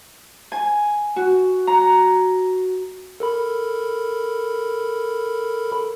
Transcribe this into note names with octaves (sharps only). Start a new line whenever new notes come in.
G#5
F#4
A#5
A4 A#4 B5